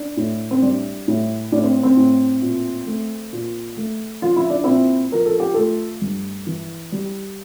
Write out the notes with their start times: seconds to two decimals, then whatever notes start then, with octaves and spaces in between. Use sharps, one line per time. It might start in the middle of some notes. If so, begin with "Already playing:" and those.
Already playing: D4
0.17 A2
0.51 C4
0.62 G3 D4
1.08 A2
1.52 A2 D4
1.63 C4
1.83 C4
1.97 A2
2.42 A#2
2.87 A3
3.33 A#2
3.77 A3
4.22 F3 F4
4.36 E4
4.50 D4
4.64 A#2 C4 E4
5.12 F3 A#4
5.26 A4
5.40 G4
5.54 A3 F4 A4
6.02 G2
6.47 E3
6.92 G3